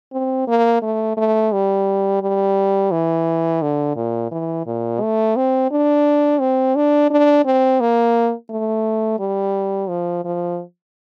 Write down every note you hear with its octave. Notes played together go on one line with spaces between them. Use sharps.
C4
A#3
A3
A3
G3
G3
E3
D3
A#2
E3
A#2
A3
C4
D4
C4
D4
D4
C4
A#3
A3
G3
F3
F3